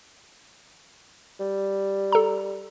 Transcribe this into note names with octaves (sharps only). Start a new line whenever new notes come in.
G3
A4 A#5